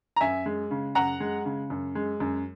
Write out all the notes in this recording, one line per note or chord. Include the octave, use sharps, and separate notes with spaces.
A#5
F#2 E5 G#5
G#3
C#3
F#2 F#5 A#5
G#3
C#3
F#2
G#3
F#2